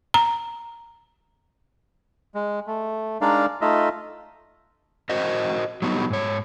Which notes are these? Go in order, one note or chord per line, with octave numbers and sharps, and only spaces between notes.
A#5
G#3
A3
G#3 D4 D#4 A#4 D5 F5
A3 D#4 F4 D#5 E5
F#4 A#4 C5 D#5
F#3 G3 B3 D#4
G#2 C#5